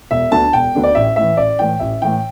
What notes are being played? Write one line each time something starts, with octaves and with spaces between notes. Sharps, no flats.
E1 E5
D2 D3 B3 D4 A5
E1 G5
D2 D3 B3 D4
D5
A1 E5
A2 E3 E5
A1 D5
A2 E3 G5
A1 E5
A2 E3 G5